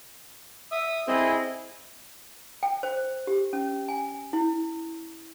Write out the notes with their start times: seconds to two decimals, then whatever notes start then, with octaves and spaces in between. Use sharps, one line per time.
0.71 E5 D#6
1.08 C4 E4 G#4 D#5
2.63 G5
2.83 C5
3.27 G4
3.53 C#4
3.89 G#5
4.33 E4